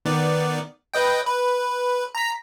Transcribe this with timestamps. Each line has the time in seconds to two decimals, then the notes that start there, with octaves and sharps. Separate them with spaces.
0.05 D#3 B3 D5
0.94 B4 D#5 G5
1.27 B4
2.15 A#5 B6